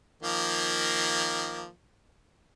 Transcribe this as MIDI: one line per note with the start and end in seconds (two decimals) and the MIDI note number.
0.23 1.68 51
0.23 1.68 53
0.23 1.68 58